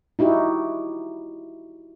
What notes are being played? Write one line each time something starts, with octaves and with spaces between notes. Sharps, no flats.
D#4 E4 F#4 G4